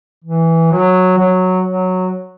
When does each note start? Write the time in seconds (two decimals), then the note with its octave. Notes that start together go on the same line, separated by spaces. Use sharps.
0.24 E3
0.71 F#3
1.18 F#3
1.65 F#3